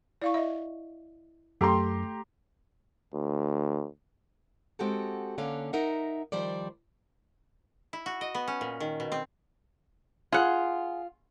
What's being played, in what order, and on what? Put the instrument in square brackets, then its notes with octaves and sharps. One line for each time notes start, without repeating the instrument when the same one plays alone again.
[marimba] E4 [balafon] D5 F5 C#6
[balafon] D#5 E5
[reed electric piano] F#2 [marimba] A3 [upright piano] G4 A#5 C6 [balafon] A4 G5
[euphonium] D2
[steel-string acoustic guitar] G#3 C4 F#4 G4 A4
D3 A#3 C#4 D4 F5
D#4 A#4 E5 F#5
D#3 F3 G3 C5 D5
[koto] E4
F#4
D#5
B3
C#4
A#2
D#3
B2
C4
[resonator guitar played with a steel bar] F4 [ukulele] G#4 F#5